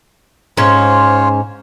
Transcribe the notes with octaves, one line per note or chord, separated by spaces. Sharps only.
G#2 C#4 F4 C5 C#5